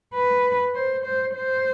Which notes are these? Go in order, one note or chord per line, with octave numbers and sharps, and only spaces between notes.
B4
C5
C5
C5